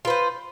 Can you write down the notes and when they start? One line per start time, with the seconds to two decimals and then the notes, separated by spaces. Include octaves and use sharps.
0.05 F4
0.07 B4
0.10 C5